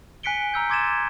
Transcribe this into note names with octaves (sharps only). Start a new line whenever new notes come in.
G#5 F#6 B6 C#7 D7 G7
A#5 E6 G6
C6 D6 G#6 A6 D#7 E7